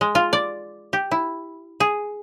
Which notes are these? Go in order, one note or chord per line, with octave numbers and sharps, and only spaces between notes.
G#3
F4
D5
G4
E4
G#4